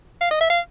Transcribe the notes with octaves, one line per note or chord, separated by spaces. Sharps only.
F5
D#5
E5
F5